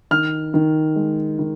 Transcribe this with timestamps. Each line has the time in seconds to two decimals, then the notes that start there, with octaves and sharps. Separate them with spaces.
0.11 D#3 F6
0.54 D#3
0.96 G#3
1.39 D#3